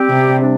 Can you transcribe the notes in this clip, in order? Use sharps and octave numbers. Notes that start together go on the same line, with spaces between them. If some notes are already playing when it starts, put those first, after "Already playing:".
Already playing: G3 C4 G4
C3
C3 G3 D4